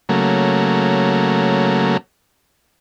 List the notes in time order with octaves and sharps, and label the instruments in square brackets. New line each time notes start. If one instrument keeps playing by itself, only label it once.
[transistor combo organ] C#3 F#3 A3 A#3